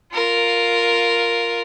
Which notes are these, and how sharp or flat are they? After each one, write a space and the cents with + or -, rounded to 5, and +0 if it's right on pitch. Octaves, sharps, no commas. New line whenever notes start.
F4 +0 A#4 +0